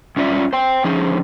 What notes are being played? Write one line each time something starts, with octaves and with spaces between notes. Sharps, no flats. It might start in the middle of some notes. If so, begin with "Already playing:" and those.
G2 C#4 F4 D5 E5
C5 G5
D3 F3 C#4 D#4 G#4 C5